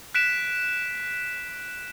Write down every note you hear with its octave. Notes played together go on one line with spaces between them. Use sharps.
F#6 B6 D7 E7